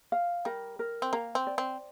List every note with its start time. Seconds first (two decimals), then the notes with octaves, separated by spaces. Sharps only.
0.12 F5
0.45 G3 A#4
0.79 A#4
1.02 C4
1.13 A#3 A#5
1.35 C4
1.47 D5
1.58 C4